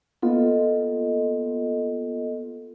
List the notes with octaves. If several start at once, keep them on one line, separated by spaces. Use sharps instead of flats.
A#3 B3 F4 A4 D#5